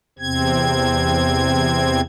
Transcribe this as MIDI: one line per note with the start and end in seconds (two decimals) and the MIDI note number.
0.19 2.01 40
0.19 2.01 48
0.19 2.01 60
0.19 2.01 92